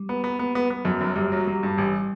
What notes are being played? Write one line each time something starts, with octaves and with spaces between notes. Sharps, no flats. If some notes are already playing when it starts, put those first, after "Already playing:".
Already playing: G3
B3
B3
B3
B3
B3
F#2 F#3
F#1
F#2 G3
F#3
F#3 G3
G2
A1 G3